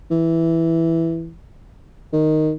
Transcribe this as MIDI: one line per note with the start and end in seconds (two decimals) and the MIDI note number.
0.11 1.33 52
2.12 2.53 51